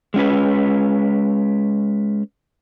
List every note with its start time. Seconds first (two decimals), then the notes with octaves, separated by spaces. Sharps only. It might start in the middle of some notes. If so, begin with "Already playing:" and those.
0.14 G#3 C#4 B4